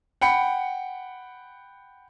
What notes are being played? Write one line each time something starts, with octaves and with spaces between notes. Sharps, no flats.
F#5 G5 B5 C#7